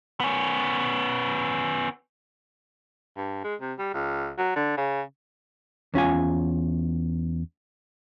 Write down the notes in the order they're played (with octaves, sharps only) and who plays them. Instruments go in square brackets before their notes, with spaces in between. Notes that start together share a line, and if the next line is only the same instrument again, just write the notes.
[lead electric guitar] B3 C#4
[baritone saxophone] G2
G#3
C3
G3
C#2
F#3
D3
C#3
[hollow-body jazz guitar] E2 C#4 F4 G#5